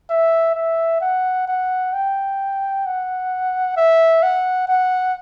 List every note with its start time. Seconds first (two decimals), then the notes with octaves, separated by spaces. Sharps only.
0.10 E5
0.55 E5
1.01 F#5
1.48 F#5
1.93 G5
2.86 F#5
3.77 E5
4.23 F#5
4.68 F#5